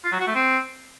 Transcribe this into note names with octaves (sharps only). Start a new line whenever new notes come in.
F4
F#3
F#4
A3
C4